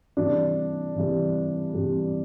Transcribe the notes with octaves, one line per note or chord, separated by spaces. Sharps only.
C3 E3 G3 D4
C3 E3 G3
C3 E3 G3